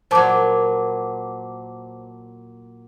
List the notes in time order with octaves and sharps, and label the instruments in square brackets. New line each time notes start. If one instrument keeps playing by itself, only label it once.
[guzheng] A#2 F#3 [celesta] C5 A5 D6